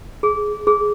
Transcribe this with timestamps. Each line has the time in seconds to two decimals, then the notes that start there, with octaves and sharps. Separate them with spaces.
0.23 G#4
0.67 G#4